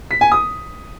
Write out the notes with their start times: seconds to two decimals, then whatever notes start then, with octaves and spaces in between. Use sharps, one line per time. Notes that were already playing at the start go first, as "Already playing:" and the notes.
0.11 B6
0.21 G#5
0.32 D#6